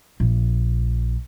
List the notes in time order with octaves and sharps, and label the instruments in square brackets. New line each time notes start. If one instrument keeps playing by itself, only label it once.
[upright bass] A#1